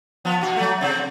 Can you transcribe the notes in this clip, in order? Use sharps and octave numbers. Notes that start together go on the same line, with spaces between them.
F3 B3
B2 F#4
F#3 A3
C3 C4